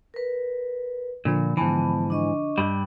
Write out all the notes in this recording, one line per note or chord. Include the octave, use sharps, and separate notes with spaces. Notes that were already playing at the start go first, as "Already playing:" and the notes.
A#4 B4
A#2 D3 F3 B5
G#2 E3 B3 A5
D4 D#5 C#6
G2 G3